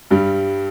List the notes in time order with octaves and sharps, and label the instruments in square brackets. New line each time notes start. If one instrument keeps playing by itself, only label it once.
[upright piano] G2 G3